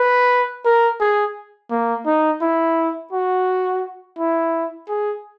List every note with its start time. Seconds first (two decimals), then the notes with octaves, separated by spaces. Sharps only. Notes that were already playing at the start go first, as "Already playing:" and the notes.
Already playing: B4
0.65 A#4
1.00 G#4
1.71 A#3
2.06 D#4
2.41 E4
3.13 F#4
4.19 E4
4.89 G#4